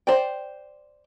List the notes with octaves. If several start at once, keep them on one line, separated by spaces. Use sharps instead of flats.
C5 D5 G5